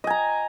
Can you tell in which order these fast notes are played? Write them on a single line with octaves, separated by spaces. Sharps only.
D#5 G#5 A#5